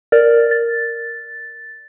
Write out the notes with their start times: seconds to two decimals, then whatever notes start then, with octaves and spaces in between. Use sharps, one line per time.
0.12 A#4 D5
0.51 A6